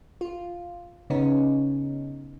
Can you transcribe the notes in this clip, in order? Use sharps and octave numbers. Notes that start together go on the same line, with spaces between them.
F4
C#3 B3 C#4 D#4